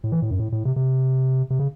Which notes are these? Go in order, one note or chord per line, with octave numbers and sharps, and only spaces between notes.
A2
E3
A2
F#2
A2
A2
C3
C3
C3
C#3